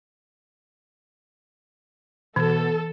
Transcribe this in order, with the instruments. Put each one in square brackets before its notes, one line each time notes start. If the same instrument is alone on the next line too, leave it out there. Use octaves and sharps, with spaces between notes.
[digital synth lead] B2 [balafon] E3 [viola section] A4